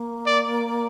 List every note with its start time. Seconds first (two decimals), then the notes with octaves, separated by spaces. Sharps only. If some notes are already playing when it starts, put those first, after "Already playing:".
Already playing: A#3
0.26 D5